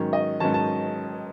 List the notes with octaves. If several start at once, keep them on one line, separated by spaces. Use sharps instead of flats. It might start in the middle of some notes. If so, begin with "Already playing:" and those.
Already playing: G#2 D#3 F#3 C#4
D#5
G#2 D#3 F#3 C#4 A5
A5